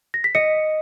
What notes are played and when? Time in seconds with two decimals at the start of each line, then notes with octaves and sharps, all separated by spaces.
0.14 A#6
0.24 B6
0.35 D#5 C#7